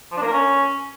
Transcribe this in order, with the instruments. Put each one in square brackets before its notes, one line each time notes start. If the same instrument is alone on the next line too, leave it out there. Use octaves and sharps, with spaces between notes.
[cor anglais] F3
D4
A#3
A#4
C#4